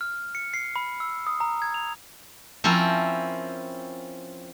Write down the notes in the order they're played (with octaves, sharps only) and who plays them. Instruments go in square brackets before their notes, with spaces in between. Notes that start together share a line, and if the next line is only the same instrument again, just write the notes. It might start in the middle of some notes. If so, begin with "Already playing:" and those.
[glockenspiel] F6
C#7
C7
B5
E6
D#6
A#5
G#6
F7
[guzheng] F3 C4 C#4 E4 A#4